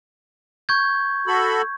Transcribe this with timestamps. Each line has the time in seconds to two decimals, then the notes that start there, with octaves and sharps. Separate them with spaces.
0.69 C#6 G6 G#6
1.27 F#4 A4 B5